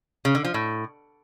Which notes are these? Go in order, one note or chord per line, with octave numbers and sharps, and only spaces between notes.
C#3
D3
F3
A2